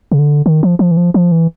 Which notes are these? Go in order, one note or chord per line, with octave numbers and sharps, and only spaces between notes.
C#3
D3
D#3
F3
F3
E3
F3
F3
E3